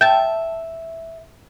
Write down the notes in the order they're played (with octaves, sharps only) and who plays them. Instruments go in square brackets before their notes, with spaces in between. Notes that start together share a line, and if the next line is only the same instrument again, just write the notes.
[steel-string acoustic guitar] E5 [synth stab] G5 A5